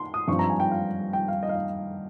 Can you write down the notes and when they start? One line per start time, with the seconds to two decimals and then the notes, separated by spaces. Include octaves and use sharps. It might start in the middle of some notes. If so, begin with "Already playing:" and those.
Already playing: C6
0.14 D#6
0.28 G2 F3 C4 C#6
0.39 A#5
0.50 G#5
0.60 G5
0.71 F5
1.13 G5
1.28 F5
1.43 D#5
1.49 F5
1.56 D#5